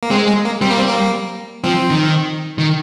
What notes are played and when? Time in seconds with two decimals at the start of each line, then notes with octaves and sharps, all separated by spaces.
0.03 A#3
0.11 G#3 C4
0.28 G#3
0.45 A#3
0.61 G3 C4
0.71 A#3
0.79 C4
0.88 A#3
1.64 F3 C4
1.90 D#3
2.58 D#3